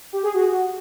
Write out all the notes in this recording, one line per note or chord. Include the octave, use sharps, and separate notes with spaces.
G4
G#4
F#4